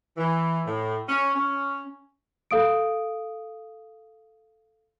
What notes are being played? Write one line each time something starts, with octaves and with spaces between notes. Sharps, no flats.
E3
A2
C#4
C#4
A4 F5 D#6 D7